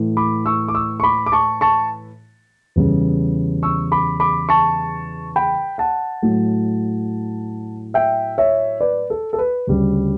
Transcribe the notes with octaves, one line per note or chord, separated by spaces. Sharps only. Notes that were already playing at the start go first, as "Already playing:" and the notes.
Already playing: A2 E3 A3
B5 D6
C#6 E6
D6
C#6 E6
C#6
B5 D6
D6
A5 C#6
A5 C#6
E2 C#3 G3
C#6 E6
B5 D6
B5 D6
A5 C#6
G5 B5
F#5 A5
A2 F#3 A3
E5 G5
C#5 E5
B4 D5
A4
A4
B4
D2 C#3 G3